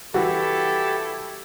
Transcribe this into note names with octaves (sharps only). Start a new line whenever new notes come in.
E3 G3 E4 F#4 G4 A4